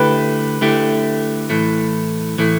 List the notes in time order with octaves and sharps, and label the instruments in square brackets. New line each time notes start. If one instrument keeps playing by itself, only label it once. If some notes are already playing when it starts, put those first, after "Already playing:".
Already playing: [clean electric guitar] D3 A3 E4 G4 [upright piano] B4
[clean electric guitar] D3 A3 E4 G4
A2 E3 A3
A2 E3 A3